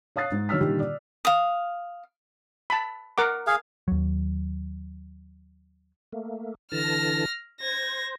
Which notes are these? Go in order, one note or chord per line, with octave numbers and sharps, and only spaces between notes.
C#5 F5 D#6 F#6 A6 C7
G#2
D#3 F#3 C#5 E6 F6 B6
A#2 D3 D#3 G3 F4 G4
D5
F5 D#6
A5 B5
A#4 F#5 D6
G#4 F5
D#2 F#3
A3 A#3
D3 E3 A5 F6 A#6
C5 G#6 A#6